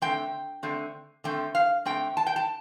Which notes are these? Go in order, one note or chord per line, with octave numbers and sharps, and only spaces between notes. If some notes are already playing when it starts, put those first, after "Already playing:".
D3 A3 C4 G5
D3 A3 C4
D3 A3 C4 G5
F5
D3 A3 C4 G5
A5
G5
A5